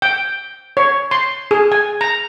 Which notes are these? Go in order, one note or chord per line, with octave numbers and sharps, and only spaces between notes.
G5
C#5
C6
G#4
G#5
A#5